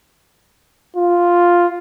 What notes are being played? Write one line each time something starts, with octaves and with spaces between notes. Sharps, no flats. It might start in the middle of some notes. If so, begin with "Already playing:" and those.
F4